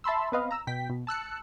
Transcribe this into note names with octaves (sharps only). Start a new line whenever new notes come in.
E5 A5 B5 C6 E6
B3 C4 B4 D#5 F5
A#5 E6
B2 G5 B6
B2
A5 E6 F#6 C#7